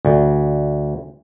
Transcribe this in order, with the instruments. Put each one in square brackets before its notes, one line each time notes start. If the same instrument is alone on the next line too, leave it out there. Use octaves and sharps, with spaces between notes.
[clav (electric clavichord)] D2